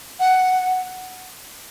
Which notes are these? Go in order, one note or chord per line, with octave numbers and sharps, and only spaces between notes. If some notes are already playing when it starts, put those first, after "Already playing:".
F#5